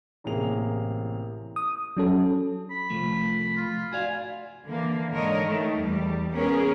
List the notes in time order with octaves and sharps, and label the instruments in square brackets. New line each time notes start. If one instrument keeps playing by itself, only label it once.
[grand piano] A1 C3 A#3 G#4 F7
[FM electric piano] D#6
F#3 C#4 A4
[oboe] B5
[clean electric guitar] C2 F3 A3
[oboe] F4
[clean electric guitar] F#4 D5 F5 [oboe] G#5
[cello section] D3 E3 A#3
G#2 D3 A#4 C#5 D#5
D#3 A3
E2 G3
B3 C#4 G#4 A#4